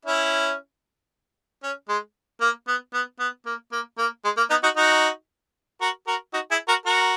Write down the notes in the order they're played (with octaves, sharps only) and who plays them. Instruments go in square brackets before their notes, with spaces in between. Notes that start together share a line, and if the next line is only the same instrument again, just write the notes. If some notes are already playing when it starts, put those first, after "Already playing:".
[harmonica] C#4 E4
C#4
G#3
A#3
B3
B3
B3
A#3
A#3
A#3
G#3
A#3
B3 D#4
D#4 F#4
D#4 F#4
F#4 A#4
F#4 A#4
D#4 F#4
E4 G#4
F#4 A#4
F#4 A#4